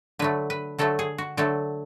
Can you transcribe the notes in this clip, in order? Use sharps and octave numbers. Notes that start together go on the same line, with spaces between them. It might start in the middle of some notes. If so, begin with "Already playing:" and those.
D3 F#3 A3 B4
B4
D3 F#3 A3 A4
G#4
F#4
D3 F#3 A3 A4